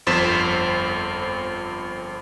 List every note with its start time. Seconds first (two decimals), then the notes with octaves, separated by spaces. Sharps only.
0.07 G1 F2 C5 A6 B6 E7